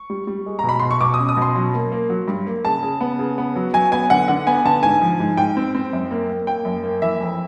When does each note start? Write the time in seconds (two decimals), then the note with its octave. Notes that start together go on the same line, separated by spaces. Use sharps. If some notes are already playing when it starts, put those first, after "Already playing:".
Already playing: C#6
0.10 G3
0.27 G3
0.46 G#3
0.59 B2 A#5
0.69 B5
0.79 B2 C6
0.91 C#6
1.01 B2 D6
1.14 D#6
1.19 C#4
1.29 D#6
1.37 B2 C6
1.56 F#3
1.74 A#3
1.92 A#3
2.10 F#3
2.28 G2
2.46 A#3
2.65 C#3 A5
2.82 C#3
3.01 B3
3.19 C#3
3.38 B3
3.56 F#3
3.73 F#3 G#5
3.92 B3 G#5
4.10 D3 F#5
4.28 D3 F#5
4.47 B3 G#5
4.65 D3 A5
4.83 G#2 G#5
5.01 F3
5.20 G#2
5.37 G#2 G5
5.57 C4
5.75 C4
5.93 F#2
6.11 A#3
6.30 A#3
6.47 A#3 G5
6.65 F#2
6.84 A#3
7.02 E3 E5
7.21 F2